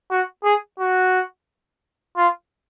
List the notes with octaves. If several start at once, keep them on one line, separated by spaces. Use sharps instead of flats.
F#4
G#4
F#4
F4